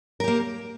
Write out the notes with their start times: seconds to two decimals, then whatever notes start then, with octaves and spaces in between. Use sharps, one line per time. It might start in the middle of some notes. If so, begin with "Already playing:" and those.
0.20 A#4
0.24 G4
0.28 A#3